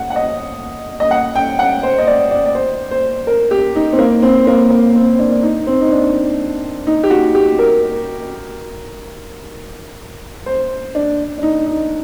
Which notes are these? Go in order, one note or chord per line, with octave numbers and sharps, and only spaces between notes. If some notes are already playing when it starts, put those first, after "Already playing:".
Already playing: F#5
F#5
D#5
D#5
F#5
G5
F#5
C5
D#5
D5
D5
D5
C5
C5
A#4
G4
D#4
C4
A#3
C4
A#3
A#3
C4
D4
D4
D#4
C4
D#4
D4
D#4
G4
F#4
G4
A#4
C5
D4
D4
D#4
D#4